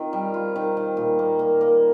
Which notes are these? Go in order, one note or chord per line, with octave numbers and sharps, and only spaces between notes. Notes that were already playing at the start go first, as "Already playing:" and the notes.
Already playing: D#3 C4 F4
G3
F4
D#3
D#3
A#2
A#3
A#3
A#3